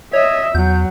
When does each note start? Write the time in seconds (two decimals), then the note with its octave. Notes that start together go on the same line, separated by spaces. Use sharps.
0.13 C#5 D#5 E5
0.55 E2 F#3 G6